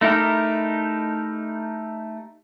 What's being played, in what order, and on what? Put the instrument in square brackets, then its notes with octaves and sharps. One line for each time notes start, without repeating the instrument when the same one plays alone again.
[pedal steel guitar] A3 D#4 E4 G4 A#4